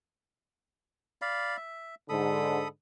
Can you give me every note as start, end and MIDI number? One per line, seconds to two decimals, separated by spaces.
1.22 1.57 74
1.22 1.57 77
1.22 1.57 83
1.57 1.95 76
2.09 2.64 44
2.09 2.64 50
2.09 2.68 69
2.09 2.68 83
2.09 2.68 87